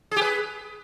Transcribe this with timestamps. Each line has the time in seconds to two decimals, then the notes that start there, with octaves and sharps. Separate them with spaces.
0.11 G#4
0.16 G4
0.21 B4